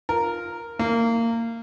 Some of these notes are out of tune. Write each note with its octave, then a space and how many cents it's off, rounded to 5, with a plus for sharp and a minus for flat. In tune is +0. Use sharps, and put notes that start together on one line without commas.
F4 +0 A#4 +0
A#3 -20 E4 -25